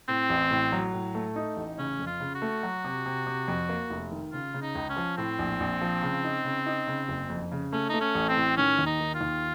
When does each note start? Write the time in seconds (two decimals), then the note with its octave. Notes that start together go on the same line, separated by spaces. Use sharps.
0.08 A2 C4
0.30 A1
0.51 A2
0.72 F#3
0.93 A2
1.15 A3
1.36 D#4
1.57 A1
1.78 C#3 C#4
1.99 F2
2.06 F4
2.20 C#3
2.35 F#4
2.42 A3
2.63 F#3
2.85 C3
3.06 C3
3.27 C3
3.48 F2
3.69 A#3
3.90 F1
4.12 D#3
4.32 C#3 F4
4.54 C#3
4.62 D#4
4.75 C#2
4.89 C#4
4.96 F3
5.17 A2 C4
5.39 A#1
5.60 A#1
5.81 F3
6.03 C#3
6.24 D#4
6.45 C#3
6.66 D#4
6.87 C#3
7.08 F#1
7.30 F2
7.52 C#3
7.72 A3 C#4
7.89 A3 D#4
8.00 C#4
8.15 A1
8.29 C4
8.36 A2
8.57 D#3 C#4
8.79 D#2
8.86 D#4
9.00 D#3
9.14 F4
9.21 D#2